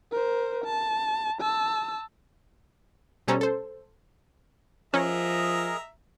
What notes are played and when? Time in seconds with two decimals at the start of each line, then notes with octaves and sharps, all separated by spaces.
0.12 A#4 C5
0.64 A5
1.41 A5 E6
3.28 B2 G3 C#4 A4 C5 A#5
3.41 A4 C5
4.94 F3 C#4 G#4 A#4 D#5 E5 A#5